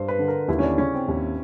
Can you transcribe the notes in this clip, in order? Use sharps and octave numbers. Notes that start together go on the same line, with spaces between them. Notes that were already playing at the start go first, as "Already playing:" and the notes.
Already playing: G2 C5
B4
D3
A#4
D#2 E4
C#4
D4
C#3 C#4
C4
D#2